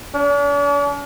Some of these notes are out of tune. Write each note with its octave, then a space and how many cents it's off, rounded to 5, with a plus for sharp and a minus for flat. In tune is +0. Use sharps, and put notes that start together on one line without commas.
D4 -45